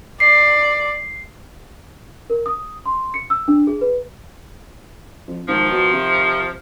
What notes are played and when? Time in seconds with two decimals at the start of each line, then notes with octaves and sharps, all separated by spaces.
0.20 D5 C7
2.30 A#4
2.46 D#6
2.86 C6
3.14 C#7
3.30 E6
3.48 D4
3.67 G#4
3.81 B4
5.27 F2
5.48 G#1 D#3 F3
5.70 B2
5.93 C3